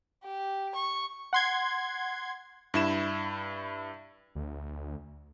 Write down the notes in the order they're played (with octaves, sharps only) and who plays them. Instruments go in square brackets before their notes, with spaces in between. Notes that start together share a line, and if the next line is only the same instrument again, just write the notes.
[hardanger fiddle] G4
C#6
[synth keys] F#5 C6 G#6
[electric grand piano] G2 E4 E7
[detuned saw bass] D2